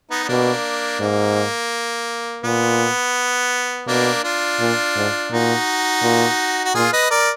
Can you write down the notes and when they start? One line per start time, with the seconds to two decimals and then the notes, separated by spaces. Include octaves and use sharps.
0.10 B3 D#4
0.24 B3
0.29 B2 A#3 D4
1.00 G#2 A#3
2.44 A#2 B3
3.87 B2 A#3 D4
4.24 D4 F4
4.60 A#2
4.96 G#2
5.31 A#2 D#4 F#4
6.03 A#2
6.65 F#4
6.75 A#2 F4 G#4
6.93 B4 D#5
7.11 A#4 D5